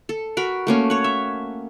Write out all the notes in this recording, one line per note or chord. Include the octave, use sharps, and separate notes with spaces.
A4
F#4 A#4 B5
A3 A#3 C#4
C#5 F#5
E5